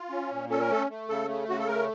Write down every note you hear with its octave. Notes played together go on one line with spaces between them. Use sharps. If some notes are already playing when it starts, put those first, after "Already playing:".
Already playing: F4
C#4
A#2
C#4 A4
A#4
A3 A4
A3
C#3 A4
A3
C#3 F#4
A4
A3 A#4